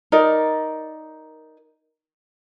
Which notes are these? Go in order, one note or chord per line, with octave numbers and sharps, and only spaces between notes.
D#4 A#4 D5